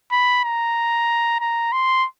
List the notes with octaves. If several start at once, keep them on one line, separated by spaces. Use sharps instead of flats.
B5
A#5
A#5
C6